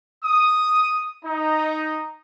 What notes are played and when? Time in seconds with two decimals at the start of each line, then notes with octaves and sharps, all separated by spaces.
0.23 D#6
1.24 D#4